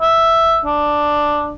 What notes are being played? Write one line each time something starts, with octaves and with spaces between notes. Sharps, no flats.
E5
D4